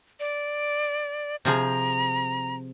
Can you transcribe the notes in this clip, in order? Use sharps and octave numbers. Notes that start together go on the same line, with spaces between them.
D5
C3 F3 G#4 A#5